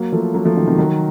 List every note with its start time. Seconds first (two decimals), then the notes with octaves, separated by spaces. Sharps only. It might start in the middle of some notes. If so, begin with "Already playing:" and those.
Already playing: F#3 A#3
0.12 F3 A3
0.34 F#3 A#3
0.45 F3 A3
0.56 D#3 F#3
0.67 C3 D#3
0.78 D#3 F#3